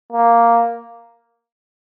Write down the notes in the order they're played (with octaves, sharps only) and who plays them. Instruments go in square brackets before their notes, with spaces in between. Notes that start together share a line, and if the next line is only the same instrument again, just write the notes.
[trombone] A#3